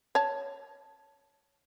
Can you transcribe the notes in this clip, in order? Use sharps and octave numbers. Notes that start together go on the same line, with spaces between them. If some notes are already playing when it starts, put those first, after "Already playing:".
C#5 A5